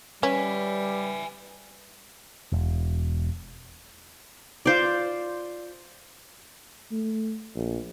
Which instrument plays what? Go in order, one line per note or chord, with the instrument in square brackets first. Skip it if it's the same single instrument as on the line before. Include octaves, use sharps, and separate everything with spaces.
[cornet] G3 [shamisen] C#4 [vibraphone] B4 [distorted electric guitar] E5 G#5
[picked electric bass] E1
[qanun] F4 C5 D5
[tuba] A3
A#1